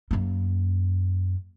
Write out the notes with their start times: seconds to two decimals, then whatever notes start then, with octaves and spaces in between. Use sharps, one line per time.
0.11 F#2 A#3